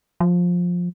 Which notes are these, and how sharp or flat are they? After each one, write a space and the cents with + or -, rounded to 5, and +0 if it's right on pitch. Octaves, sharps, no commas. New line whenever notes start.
F3 +15